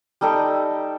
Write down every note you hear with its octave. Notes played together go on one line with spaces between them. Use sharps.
G3 D#4 A4 G5